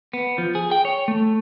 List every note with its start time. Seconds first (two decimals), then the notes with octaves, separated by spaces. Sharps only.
0.13 B3
0.38 F3
0.55 G#4
0.72 G5
0.85 C#5
1.08 A3